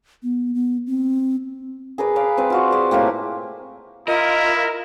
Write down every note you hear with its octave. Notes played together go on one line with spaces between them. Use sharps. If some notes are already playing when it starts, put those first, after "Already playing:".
B3
B3
C4
G#4 A#4 B4 D5
B4 D5 F5
C4 B4 D5
F4 F#4 D5
G#4 D5
A2 C3 A#3 G4
E4 F4 A#4 D#5